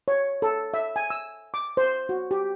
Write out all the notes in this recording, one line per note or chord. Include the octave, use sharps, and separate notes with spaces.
C#5
A4
E5
G#5
E6
D6
C5
F#4
G4